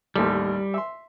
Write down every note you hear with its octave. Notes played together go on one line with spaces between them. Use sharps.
A1 D#2 G3 A4
E5 C6